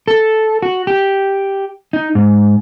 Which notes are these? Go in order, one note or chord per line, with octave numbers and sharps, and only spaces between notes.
A4
F#4
G4
D#4
G#2